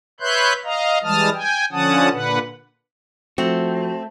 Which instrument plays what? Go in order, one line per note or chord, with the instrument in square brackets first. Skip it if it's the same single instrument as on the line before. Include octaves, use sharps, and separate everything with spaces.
[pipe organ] B4 C#5 E5 C6 F#6 G6
D#5 F5 A#5
E3 G3 G#3 A5 D#6 F6
G5 G#5
D3 F3 C#4 F#5 A5 D#6
A#2 D3 B4 F#5
[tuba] F3 [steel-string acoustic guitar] A3 [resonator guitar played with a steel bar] C4 [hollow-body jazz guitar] F#4